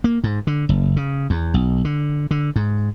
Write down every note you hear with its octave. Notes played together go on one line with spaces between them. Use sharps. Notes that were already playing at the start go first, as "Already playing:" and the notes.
A#3
G#2
D3
F#1
C#3
E2
B1
D3
D3
G#2